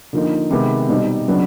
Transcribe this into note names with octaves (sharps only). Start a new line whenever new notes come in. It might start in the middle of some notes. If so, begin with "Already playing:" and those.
D3 F3 A#3 D#4
C3 D#3 G#3 B3
B2 G3 C4 D#4
C#3 F#3 B3 D4